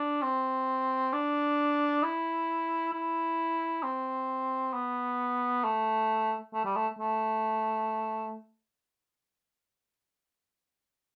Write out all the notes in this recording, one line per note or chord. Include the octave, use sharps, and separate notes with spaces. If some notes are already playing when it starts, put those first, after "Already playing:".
Already playing: D4
C4
D4
E4
E4
C4
B3
A3
A3
G3
A3
A3